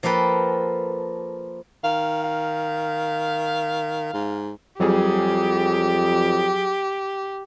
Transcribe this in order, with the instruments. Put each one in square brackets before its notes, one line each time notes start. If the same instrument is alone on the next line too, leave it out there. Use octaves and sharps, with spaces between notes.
[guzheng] F3 A#3 A4 B4 G5
[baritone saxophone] D#3 [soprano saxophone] F5
[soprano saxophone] F5
[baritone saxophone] G#2
[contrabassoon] F2 [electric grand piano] F#3 G3 G#4 [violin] G4